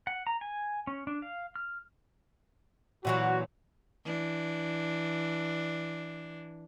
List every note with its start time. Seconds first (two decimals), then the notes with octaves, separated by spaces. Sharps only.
0.07 F#5
0.27 A#5
0.41 G#5
0.87 C#4
1.07 D4
1.22 F5
1.56 F6
3.05 A#2 E3 F#3 F#4
4.05 E3 D4